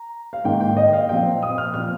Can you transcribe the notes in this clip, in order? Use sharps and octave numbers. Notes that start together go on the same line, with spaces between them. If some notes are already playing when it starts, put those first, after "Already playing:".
Already playing: A#5
F5
G#2 D#3 A#3 G5
G5
D#5
F5
A#2 F3 C4 G5
D#6
F6
A#2 F3 C4 F6